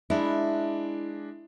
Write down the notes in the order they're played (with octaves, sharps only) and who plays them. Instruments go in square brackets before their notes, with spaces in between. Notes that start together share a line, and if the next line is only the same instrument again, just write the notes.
[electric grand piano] G#3 D4 [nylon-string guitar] E4